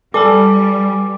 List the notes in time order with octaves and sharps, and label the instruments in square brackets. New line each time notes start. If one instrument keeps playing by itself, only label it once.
[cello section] G3 [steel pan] A4 [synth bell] B4 D5 G#5 [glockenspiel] D6